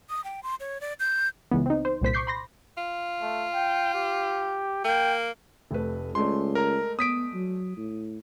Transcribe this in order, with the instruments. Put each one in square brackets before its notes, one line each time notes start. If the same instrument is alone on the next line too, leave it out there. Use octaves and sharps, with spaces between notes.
[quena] D#6
G5
C6
C#5
D5
G6
[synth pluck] C#2 E3 B3
C4 D#4
C5
C2 A#2 C5 B6
C#6 D6 G6 C7
B5 C6 A#6
[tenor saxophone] F4
[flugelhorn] A3
G5
G4
[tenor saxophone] A#3 [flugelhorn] G5
[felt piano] F1 A3 B4
[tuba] C#2 [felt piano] G#3 A3 D5 [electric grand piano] C6
[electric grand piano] A#4 A#5
[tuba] B3 [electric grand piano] D#6 B6 D7
[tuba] F#3
A2